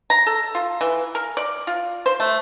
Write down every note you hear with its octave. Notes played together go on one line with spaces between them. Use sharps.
A#5
A4
F4
E3
A#4
D5
F4
C5
A3